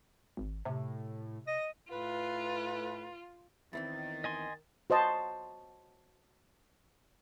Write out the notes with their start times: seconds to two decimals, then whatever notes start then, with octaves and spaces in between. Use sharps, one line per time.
0.37 G#1
0.65 A2 C3
1.47 D#5 A#6
1.92 A2 F4 B4
3.73 E2 D#3 E3 C4 A6
4.24 D#5 G#5 C6
4.90 F#4 C5 D#5 A5